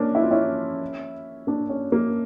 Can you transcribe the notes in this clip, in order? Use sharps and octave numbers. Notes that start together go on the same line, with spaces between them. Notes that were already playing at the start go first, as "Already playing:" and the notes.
Already playing: A#3 C#4 D4
E4
F4
C#4 E4
A#3 D4
C#4
A#3